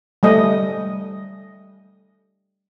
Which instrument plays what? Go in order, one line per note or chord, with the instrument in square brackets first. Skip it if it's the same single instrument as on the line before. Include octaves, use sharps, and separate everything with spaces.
[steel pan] G3 A3 D#5